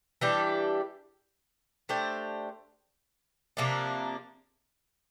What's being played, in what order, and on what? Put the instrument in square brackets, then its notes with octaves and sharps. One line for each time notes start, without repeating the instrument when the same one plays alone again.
[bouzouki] E3 G3 D4 G4
A3 D4 G4 C5
C3 F3 A#3 D4